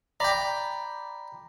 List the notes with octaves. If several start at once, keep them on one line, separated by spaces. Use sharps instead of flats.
D5 G5 A#5 B5